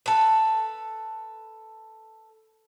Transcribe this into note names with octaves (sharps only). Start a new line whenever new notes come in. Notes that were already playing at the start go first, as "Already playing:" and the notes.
A4 B4